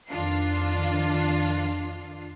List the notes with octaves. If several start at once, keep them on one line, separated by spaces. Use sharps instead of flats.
F2 D#3 D4 F4 C7